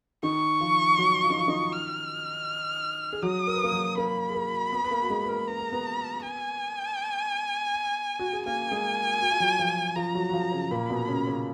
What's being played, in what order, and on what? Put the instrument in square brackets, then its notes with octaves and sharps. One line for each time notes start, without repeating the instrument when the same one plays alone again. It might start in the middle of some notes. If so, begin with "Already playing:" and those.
[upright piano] D#3 D#4 [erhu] C#6
[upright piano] F3 F4
F#3 F#4
F4
D#4
F3 F4
D#3 D#4
[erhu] F6
[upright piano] G#4
[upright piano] F#3 F#4 [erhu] D#6
[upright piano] A#4
B4
A#3 A#4
F#3 F#4
[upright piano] A#3 A#4 [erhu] B5
[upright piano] G#4
A#3 A#4
B3 B4
B4
A#3 A#4
F#4
G#3 G#4
B4
A#3 A#4
[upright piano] B4 [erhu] A#5
[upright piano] A#4
B3 B4
[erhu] G#5
[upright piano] F#4
G#4
[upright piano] A#3 A#4 [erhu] G#5
[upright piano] G#3 G#4
F#4
F4
F#3 F#4
F3 F4
[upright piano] F3 F4 [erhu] A#5
[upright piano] F#3 F#4
F#4
F3 F4
C#3 C#4
[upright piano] A#2 A#3 [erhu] B5
[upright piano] B2 B3
C#3 C#4
C#3 C#4